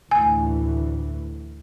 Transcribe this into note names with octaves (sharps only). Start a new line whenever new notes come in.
D2 A2 E3 G#5